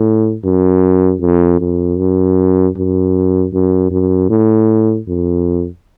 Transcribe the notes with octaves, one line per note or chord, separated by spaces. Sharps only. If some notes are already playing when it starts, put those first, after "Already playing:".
Already playing: A2
F#2
F2
F2
F#2
F#2
F#2
F#2
A2
F2